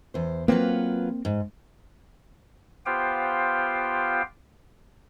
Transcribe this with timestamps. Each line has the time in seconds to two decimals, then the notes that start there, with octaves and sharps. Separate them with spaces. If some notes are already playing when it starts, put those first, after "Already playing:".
0.14 E2 C5
0.48 F#3 A#3 C4 F4 B4
1.25 G#2
2.86 B3 F4 G4 C5 F5 G5